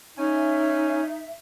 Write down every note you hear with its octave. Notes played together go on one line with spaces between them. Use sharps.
C#4 D#4 E5 G#5